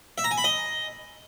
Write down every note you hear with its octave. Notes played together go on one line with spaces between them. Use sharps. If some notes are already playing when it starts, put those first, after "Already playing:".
E5
A#5
G#5
B5
D#5